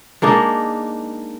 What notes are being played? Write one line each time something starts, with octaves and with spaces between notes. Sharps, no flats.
G#3 A#3 D4 D#4